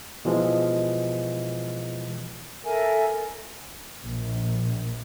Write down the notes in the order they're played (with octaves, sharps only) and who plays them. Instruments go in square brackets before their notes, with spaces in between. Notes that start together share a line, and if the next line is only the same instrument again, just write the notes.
[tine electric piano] B2 E3 F3 G#3
[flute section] A4 A#4 E5 G#5
[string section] A#1